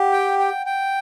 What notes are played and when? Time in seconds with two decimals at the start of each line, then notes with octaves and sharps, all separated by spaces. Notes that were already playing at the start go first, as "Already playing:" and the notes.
Already playing: G4 F#5
0.12 G5
0.39 G5
0.66 G5